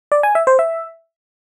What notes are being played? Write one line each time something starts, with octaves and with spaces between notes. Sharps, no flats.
D5
G#5
E5
C5
E5